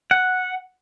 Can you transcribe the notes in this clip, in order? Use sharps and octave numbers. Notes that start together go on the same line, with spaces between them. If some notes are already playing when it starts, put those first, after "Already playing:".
F#5